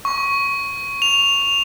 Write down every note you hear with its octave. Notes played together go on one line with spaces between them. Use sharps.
C#6
F7